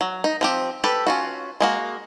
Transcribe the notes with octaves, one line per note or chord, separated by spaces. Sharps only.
F#3
D#4
F3 C4 G4
G4 A4 B4
C#4 F4 F#4
G#3 A#3 F#4